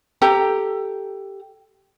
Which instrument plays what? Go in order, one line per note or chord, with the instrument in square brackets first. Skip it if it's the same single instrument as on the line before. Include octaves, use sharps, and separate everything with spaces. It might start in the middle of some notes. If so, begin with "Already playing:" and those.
[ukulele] G4 A4 A#5